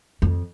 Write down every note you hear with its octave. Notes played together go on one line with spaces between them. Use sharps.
F2